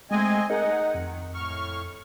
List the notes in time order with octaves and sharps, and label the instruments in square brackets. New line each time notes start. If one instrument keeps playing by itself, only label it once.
[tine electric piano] G#3 A3 [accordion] C4 D#5 G#5
[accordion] D#4 F#5 [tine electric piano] G#4 A#4 D#5
[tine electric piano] D#5
[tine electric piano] F2 [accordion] D#3
[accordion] A2 C#6 F6